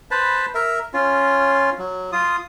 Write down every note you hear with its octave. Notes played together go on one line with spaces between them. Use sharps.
B4 C5 A5 B5
A#4 E5
C#4 F4
F#3
F4 D#6